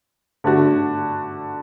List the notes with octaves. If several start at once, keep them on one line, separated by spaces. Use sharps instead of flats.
D3 A3 D4 F#4